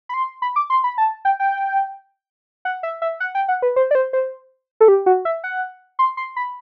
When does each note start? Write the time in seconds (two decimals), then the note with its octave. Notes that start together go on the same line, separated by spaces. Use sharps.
0.09 B5
0.14 C6
0.42 B5
0.56 D6
0.70 C6
0.84 B5
0.98 A5
1.25 G5
1.40 G5
2.65 F#5
2.83 E5
3.02 E5
3.20 F#5
3.35 G5
3.48 F#5
3.62 B4
3.76 C5
3.91 D5
3.95 C5
4.13 C5
4.81 A4
4.88 G4
5.06 F#4
5.25 E5
5.44 F#5
5.99 C6
6.17 C6
6.36 B5